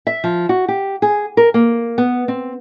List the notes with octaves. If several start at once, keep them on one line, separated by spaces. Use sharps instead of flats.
E5
F3
F#4
G4
G#4
A#4
A#3
B3
C4